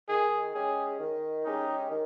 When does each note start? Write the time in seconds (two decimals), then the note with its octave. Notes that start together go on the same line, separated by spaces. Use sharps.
0.08 D#3 G#4
0.54 G#3 C#4 G4 G#4
0.99 D#3
1.44 G#3 C#4 D#4 G4
1.90 D#3